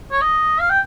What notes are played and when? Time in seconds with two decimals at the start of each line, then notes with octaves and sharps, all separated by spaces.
0.12 C#5
0.21 D#5
0.60 F5
0.70 G5